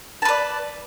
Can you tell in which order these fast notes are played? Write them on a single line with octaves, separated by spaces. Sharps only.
A5 B4 D5